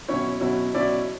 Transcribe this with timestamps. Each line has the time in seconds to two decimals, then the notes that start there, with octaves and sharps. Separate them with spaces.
0.09 B2 F#3 C#4 E4 C#5
0.41 B2 F#3 C#4 E4
0.74 B2 F#3 C#4 E4 D5